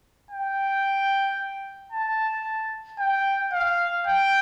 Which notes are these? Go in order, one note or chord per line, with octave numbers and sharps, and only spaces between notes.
G5
A5
G5
F5
G5